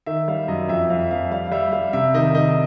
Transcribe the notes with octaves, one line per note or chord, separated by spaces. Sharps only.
D#3 E5
G3 F5
F#2 D#5
F2 E5
F2 F5
F3 F5
G3 F5
F5
G3 E5
G3 F5
C3 E5
D#3 D#5
D#3 D#5